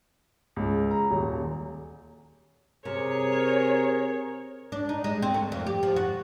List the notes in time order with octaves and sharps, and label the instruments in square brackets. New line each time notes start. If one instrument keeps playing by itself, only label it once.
[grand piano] C#2
A#5
D#1
[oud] C3 [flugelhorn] G#4 [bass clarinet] A#4 [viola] C#5
[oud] D4
D#4
G#3
C4
A3
F2
G4
F3
F#4